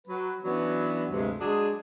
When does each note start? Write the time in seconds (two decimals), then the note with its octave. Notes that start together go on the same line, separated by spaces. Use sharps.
0.08 F#3 B4
0.43 E3 F#3 B3 C#4 D4
1.11 D2 G2 C3 G#3
1.40 F#3 G#3 D4 G#4